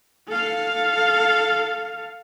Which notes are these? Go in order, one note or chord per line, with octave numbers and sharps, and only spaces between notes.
A4 F5